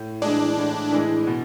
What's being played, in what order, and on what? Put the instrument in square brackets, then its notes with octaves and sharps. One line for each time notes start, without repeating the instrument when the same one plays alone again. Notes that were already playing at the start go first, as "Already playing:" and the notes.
Already playing: [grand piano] A2
[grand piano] E3 G#3 [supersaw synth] D4
[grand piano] A2
E3 G#3
B2